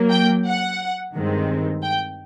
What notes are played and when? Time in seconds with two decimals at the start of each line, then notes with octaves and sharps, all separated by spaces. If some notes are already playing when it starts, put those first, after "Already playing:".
Already playing: F#3 A#3
0.11 G5
0.46 F#5
1.15 G2 D#3 G#3 C4
1.83 G5